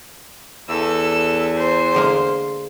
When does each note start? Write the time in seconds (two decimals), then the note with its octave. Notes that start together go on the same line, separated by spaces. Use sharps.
0.69 E2 A4 E6
1.57 C5
1.95 D3 G#3 A#3